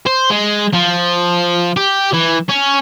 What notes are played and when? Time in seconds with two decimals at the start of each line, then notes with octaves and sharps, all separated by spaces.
0.07 C5
0.31 G#3
0.73 F3
1.77 G4
2.13 E3
2.49 C#4